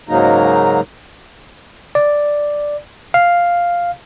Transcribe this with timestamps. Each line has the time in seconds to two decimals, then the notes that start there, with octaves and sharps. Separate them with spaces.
0.09 G#2 C#3 F#3 A#3 D#4 A#5
1.95 D5
3.14 F5